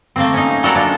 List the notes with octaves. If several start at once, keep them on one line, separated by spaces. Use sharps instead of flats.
A3 A#3 C4
C#4 D#4
F#3 G3 F#4 A4 A#4 F#5
C#4 D4 F4